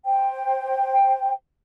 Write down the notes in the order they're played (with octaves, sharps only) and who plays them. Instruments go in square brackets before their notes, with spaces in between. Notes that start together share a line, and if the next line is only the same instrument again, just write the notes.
[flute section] C5 G5